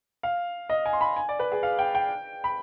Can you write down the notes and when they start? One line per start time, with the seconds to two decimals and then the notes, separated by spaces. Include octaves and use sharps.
0.23 F5
0.70 D#5
0.86 G#5
0.93 C6
1.01 B5
1.16 G#5
1.29 D5
1.40 B4
1.52 G#4
1.63 F5
1.79 G5
1.95 G5
2.44 B5